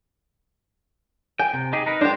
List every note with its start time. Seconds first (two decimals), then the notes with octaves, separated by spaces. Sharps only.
1.39 G5 G#5
1.53 C3
1.73 D#4 G4 G#4
1.86 D#4 A#4 B4
2.01 G#2 D4 G4 C5